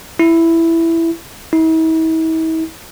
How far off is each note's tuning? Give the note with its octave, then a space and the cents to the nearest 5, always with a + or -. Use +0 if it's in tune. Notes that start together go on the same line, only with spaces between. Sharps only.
E4 +5
E4 -45